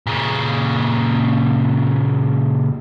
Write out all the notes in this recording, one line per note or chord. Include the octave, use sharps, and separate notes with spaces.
A#2 C#3